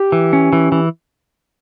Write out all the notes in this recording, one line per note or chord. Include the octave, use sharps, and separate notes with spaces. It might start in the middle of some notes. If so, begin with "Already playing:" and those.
Already playing: G4
E3
C#4
E3
E3